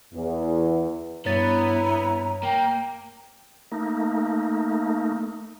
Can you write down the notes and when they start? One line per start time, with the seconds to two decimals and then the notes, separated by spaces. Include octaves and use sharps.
0.14 E2
1.26 G2 B3 E4 C#5 A#5 A6
2.43 A#3 G5
3.72 A3 A#3 D#4